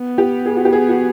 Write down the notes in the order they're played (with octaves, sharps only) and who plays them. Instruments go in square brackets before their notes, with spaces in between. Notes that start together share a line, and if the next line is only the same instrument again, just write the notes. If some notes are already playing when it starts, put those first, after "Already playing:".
Already playing: [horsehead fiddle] B3
[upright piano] G4
G#4
F#4
G4
G#4
F#4